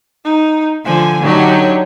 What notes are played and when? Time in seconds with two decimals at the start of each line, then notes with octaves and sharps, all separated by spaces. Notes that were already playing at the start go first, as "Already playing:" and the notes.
0.25 D#4
0.85 D3 F3 G#5
1.23 D3 F#3 D#4 G4 C#5